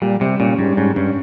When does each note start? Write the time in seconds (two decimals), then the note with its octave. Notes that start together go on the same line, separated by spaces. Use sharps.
0.02 A#2 G3
0.21 C3 G3
0.40 A#2 C#4
0.58 G#2 G3
0.77 G#2 C#4
0.96 G2 C#4